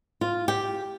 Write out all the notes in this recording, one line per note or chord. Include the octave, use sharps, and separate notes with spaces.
F4
G4